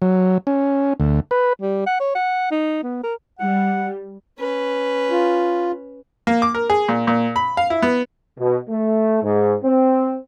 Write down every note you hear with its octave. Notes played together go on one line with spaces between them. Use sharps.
F#3
C#4
D2
B4
G3
F#5
C#5
F#5
D#4
B3
A#4
G3 F#5
C#4 B4
F4
A#3
D6
A#4
G#4
A#2
A#2
B5
F5
E4
B3
B2
A3
G#2
C4